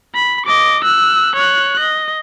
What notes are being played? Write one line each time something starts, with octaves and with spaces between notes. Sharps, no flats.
B5
D#5 D6
E6 F#6
C#5 F#6
D#5